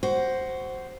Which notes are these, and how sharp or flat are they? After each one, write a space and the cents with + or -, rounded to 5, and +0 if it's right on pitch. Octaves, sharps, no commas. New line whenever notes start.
F#4 +15 C5 +0